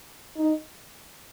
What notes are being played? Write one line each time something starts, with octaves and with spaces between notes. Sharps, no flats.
D#4